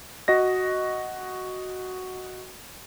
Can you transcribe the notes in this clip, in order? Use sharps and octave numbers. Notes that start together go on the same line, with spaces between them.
F#4 D#5 A#6